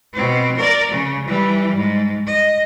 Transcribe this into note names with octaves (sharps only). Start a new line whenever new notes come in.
B2 C4
A#4 D5
C#3
E3 G3
G#2
D#5